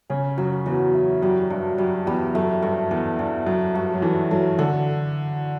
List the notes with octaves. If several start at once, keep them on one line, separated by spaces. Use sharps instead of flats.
C#3 C#4
F#2 F#3
E2 F#3
E4
F#2 G3
G2 D4
F#2 G3
E2 G3
F#2 A3
G2 A3
E2 A4
E2 D4
F#2 A4
G2 F#4
F#3
E3 A4
F#3 A4
D3 A4